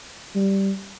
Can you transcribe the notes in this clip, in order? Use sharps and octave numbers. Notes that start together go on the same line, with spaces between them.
G3